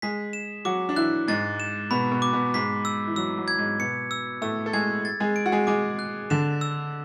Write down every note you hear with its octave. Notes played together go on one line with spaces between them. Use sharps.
G#3 G#4 B6
E7
F#3 F#4 D6
D4
E3 E4 F#6
G#2 G#3 A6
E7
B2 B3 B5
B2 B3
D6
B2 B3
G#2 G#3 B6
E6
E3
F#3 E6
F#3
G#6
G#2 G#3
B2 B3 C#7
E6
A2 A3 E6
A4
G#3 G#4 G#6
A6
G#3 G#4
D7
F#4
G#3 G#4
G#3 G#4 D6
F#6
D3 D4 E7
E6